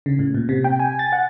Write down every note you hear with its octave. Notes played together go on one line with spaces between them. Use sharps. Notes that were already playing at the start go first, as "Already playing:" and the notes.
C#3
A2
A#2
C3
G5
G#5
A6
F#5